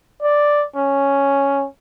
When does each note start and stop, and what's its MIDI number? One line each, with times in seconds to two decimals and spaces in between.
0.22 0.65 74
0.76 1.65 61